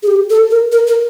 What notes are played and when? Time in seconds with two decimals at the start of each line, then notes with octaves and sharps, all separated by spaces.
0.03 G#4
0.08 G4
0.30 A4
0.51 A#4
0.72 A#4
0.87 A#4